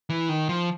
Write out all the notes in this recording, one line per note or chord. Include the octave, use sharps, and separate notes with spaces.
E3
D#3
F3